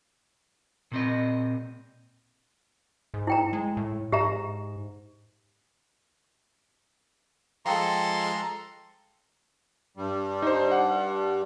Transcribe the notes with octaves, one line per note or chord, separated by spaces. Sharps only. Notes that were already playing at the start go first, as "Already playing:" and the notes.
A#2 C4 D#5
G#2
E4 G5 A#5
G#3
A2
G#2 G4 E5 A#5
F3 G#3 A4 F5 G5 A#5 C6
G2 G3
D#4 C5
F#5